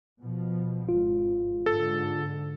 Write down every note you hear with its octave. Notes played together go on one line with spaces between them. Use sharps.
B2 F3
G#1 F4
G#2 D3 A4